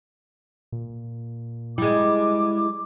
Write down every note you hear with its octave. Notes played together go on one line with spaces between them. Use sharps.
A#2
G3 G#3 E4 D6